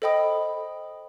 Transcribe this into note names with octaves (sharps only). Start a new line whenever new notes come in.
A4 C5 D#5 G5 B5 D#6